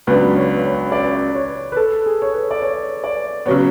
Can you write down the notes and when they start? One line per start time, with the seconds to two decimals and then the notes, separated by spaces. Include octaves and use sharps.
0.07 C#2 C#3 F#3 B3 D4 B4
0.36 C#5
0.65 C#5
0.92 D5
1.35 C#5
1.72 B4
1.76 A4
2.06 G#4
2.22 C#5
2.34 B4
2.51 D5
2.62 C#5
3.04 D5
3.46 C#3 F#3 B3 C#5